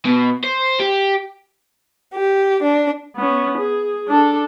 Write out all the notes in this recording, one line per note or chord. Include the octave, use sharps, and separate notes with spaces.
B2
C5
G4
G4
D4
B3 C#4
G#4
D4 A4